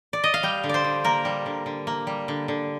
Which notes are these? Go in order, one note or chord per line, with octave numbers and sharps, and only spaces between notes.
D5
D#5
F5
G3 G5
D3
C5 D5
D3
A#3 A#4
G3
D3
D3
A#3
G3
D3
D3